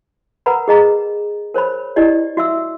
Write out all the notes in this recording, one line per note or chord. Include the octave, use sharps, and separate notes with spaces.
A#4 B4 F#5 A#5 B5
G#4 D#5 A#5
A#4 C5 C#5 B5
E4 G4 D5 D#5
F#4 E5 E6